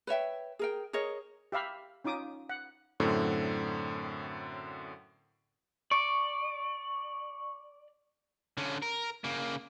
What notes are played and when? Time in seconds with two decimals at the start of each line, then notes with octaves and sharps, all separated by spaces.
0.07 B4 C#5 E5 G5
0.59 G#4 A#4 G5
0.93 G#4 A#4 C#5 D#5
1.52 G4 E5 F5 B5
2.04 C#4 D#4 F4 D6 D#6
2.49 F#5
3.00 F#2 A2 D3 C4
5.91 D5 C#6
8.58 D3 C#4
8.82 A#4
9.24 C#3 A#3